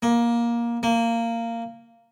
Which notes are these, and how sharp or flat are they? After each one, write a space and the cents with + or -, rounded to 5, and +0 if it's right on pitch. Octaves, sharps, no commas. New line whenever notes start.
A#3 +15
A#3 -15